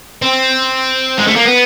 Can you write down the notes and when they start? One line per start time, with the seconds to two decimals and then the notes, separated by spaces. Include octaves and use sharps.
0.22 C4
1.18 G#3
1.27 A3
1.36 A#3
1.46 B3